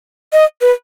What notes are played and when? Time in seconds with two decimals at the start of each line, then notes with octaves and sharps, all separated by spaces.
0.33 D#5
0.61 B4